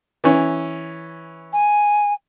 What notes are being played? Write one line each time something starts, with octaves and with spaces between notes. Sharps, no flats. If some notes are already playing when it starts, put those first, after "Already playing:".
E3 C#4
G#5